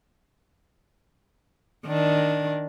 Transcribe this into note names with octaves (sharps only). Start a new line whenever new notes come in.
D#3 D4